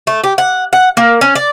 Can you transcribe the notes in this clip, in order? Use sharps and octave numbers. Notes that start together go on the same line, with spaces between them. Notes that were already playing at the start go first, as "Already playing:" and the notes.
A3
G4
F#5
F#5
A#3
C#4
D5